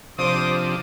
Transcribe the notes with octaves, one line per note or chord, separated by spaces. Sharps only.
C3 F3 D4 C5 D6 D#6